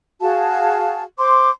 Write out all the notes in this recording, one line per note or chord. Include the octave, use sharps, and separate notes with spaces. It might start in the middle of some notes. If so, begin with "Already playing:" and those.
F#4 G#4 F5 A5
C5 C6 D6